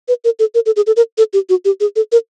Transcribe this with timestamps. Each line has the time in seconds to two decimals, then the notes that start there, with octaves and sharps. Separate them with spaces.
0.08 B4
0.25 A#4
0.39 A4
0.55 A#4
0.66 A4
0.76 G#4
0.87 A4
0.96 A#4
1.18 A4
1.33 G4
1.49 F#4
1.65 G4
1.80 G#4
1.96 A4
2.12 A#4